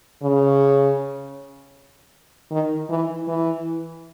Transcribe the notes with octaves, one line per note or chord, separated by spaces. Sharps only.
C#3
D#3
E3
E3